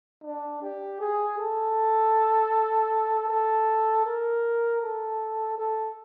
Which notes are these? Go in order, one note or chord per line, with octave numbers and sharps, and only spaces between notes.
D4
G4
G#4
A4
A4
A#4
A4
A4